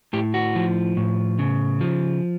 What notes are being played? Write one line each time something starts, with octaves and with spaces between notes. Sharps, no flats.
A2 G4
F#4
F3
A2
C#3
F3